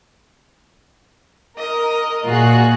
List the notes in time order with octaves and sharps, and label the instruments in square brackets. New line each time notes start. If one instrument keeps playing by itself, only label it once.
[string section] A#4 [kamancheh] D#5
[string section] A#2 F#4 F#6 [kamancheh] F4 G#4